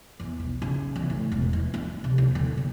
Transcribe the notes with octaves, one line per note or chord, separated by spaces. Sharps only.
E2
B1
C#3
E2
A2
E1
E3
D4
C3
D#2
D3
D#2